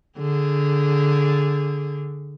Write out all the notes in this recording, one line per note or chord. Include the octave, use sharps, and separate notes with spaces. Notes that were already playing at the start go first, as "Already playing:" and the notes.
D3 G#4